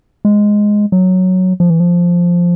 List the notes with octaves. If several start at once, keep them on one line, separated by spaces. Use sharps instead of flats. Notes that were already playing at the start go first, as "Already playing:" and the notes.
G#3
F#3
F3
E3
F3